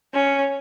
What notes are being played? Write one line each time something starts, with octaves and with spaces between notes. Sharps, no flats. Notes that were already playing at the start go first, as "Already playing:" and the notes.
C#4